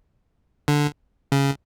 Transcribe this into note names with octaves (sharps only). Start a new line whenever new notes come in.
D3
C#3